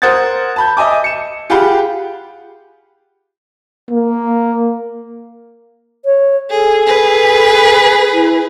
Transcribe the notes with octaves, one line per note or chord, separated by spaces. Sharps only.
A#4 C5 F#5 D#6 G#6 A6
A5 B5 G6
D#5 E5 G#5 D6
C#7 E7
F4 G4 G#4 F#5 G5 B5
A#3
C#5
G#4 A4
G#4 B4
E4